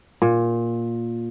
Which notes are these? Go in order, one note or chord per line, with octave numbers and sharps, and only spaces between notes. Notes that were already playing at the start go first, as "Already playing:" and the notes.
A#2